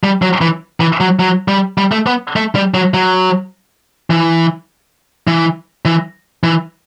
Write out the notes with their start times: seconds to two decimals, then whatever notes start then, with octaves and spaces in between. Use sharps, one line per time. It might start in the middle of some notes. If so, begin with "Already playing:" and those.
0.04 G3
0.22 F#3
0.41 E3
0.80 E3
1.00 F#3
1.20 F#3
1.48 G3
1.78 G3
1.92 A3
2.06 B3
2.36 A3
2.55 G3
2.74 F#3
2.94 F#3
4.10 E3
5.27 E3
5.85 E3
6.44 E3